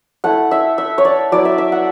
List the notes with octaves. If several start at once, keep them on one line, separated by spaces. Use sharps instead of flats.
A3 E4 F#5
E5
E5
C#5
D5
F#3 B3 E4 D5
E5
E5
F#5